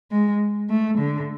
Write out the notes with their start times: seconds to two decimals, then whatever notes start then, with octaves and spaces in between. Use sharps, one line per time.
0.11 G#3
0.70 A3
0.99 D3